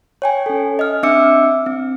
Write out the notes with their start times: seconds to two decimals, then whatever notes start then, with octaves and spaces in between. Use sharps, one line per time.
0.22 C#5 G5 G#5
0.46 C#4 A4
0.79 D#5 F6
1.03 C4 D4 E5 D6 E6 C#7
1.66 C4